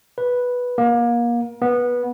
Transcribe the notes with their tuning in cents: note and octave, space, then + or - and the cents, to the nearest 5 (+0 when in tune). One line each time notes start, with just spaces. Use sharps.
B4 -5
A#3 +30
B3 -15